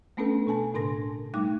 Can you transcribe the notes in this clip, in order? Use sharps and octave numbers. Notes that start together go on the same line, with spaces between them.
A3 B3 C#4 D4 A4 B4
B2 A4 G#5 A5
A2 C#3 D4 A#4 C6 A#6
G3 A3 D#4 G5 D6 F#6